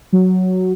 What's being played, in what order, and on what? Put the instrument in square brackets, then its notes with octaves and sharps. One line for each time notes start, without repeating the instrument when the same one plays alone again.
[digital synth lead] F#3